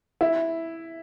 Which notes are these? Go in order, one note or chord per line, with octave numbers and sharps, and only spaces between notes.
E4